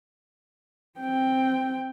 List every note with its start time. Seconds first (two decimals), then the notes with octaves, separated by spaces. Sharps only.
0.99 C4 G5